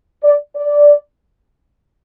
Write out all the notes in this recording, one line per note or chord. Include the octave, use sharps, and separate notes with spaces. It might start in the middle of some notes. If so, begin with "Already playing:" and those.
D5
D5